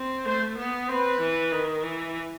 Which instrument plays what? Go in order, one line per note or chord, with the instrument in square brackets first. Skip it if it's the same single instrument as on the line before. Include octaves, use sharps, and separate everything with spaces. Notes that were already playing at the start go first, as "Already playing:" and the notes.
Already playing: [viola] C4
[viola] A3 [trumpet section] C5
[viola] B3
[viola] C4 [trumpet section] B4
[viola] E3
D#3
E3